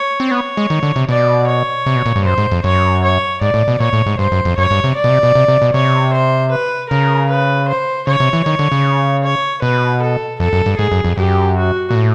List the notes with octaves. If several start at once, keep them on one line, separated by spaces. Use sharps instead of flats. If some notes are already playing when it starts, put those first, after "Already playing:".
Already playing: C#5
C4
B3 C#5
G#3
D#3
D3
C3
B2 D5
C#5
C3
B2
A#2
G2
F#2 C5
G#2
F2
F#2 C#5
C#5
G#2 D5
A2
B2
A#2 C#5
A2
G#2
G2 C5
F#2
F2
F#2 C#5
G2
C3
D5
B2
C3
B2
C3
C3
B2
C3 C#5
C5
B4
C#3 A#4
B4
C5
C#3 C#5
C3
E3
D#3 C#5
D3
C#3
C#5
B2 B4
A4
F2 A4
F#2
G2
G#2 G#4
F#2
F2
F#2 G4
F#4
A#2
A2